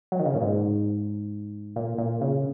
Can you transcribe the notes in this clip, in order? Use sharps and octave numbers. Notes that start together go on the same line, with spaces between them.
F#3
D#3
C#3
A#2
G#2
A#2
A#2
C#3